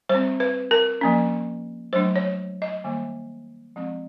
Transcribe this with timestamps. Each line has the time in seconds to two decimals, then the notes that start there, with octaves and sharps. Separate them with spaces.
0.09 G3 C5
0.15 C4
0.40 B4
0.71 A#4
1.01 F3 A#3 C#4
1.93 F#3 A3 D4 C5
2.16 C#5
2.62 D#5
2.84 D#3 G3 A#3
3.76 F3 G#3 C4